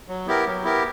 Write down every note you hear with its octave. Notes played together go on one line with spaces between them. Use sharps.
F#3
B3 E4 G4 A#4
F#3
B3 E4 G4 A#4